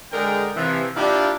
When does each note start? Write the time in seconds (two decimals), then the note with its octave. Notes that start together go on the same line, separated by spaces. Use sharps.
0.12 D3 G#3 G#4 A#4 G5 A#5
0.56 C3 E3 F3
0.96 A#3 D4 E4 F4 G4